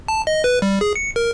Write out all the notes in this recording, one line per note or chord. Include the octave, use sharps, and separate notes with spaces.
A5
D#5
B4
G3
G#4
C#7
A#4